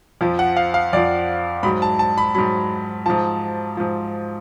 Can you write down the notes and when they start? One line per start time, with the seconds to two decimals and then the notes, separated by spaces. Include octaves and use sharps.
0.21 F2 F3
0.39 F#5
0.57 F5
0.74 F5
0.93 F2 F3 D5
1.63 G#2 F#3 B5
1.82 A5
1.99 A5
2.18 B5
2.35 G#2 F#3 B5
3.06 G#2 F3 A5
3.77 G#2 F3